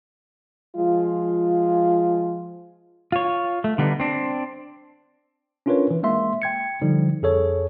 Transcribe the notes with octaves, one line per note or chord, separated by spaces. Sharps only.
F3 G#3 F4
F4 C#5
A3
D3 G3 B3 D#4
C4 D4
C#4 D4 F4 A#4 B4 C#5
E3
G#3 A#3 E5 C6
G5 G#6 C#7
D3 F3 G3 D#4
F2 G#4 A4 C#5